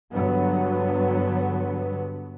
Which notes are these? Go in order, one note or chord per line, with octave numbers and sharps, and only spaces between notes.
G2 D3 F#3 B3